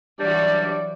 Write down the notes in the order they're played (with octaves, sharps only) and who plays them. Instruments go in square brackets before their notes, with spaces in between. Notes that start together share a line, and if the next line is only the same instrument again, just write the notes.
[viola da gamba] E3 F#3 F#4 [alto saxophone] G3 [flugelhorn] D4 [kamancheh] D5